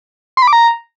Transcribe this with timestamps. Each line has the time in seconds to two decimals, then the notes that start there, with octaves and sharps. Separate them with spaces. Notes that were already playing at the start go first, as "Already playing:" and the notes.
0.37 C6
0.42 B5
0.48 D6
0.53 A#5